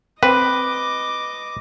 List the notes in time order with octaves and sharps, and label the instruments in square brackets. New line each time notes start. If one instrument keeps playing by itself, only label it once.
[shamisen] C4 [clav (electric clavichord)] B4 [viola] D#5 D6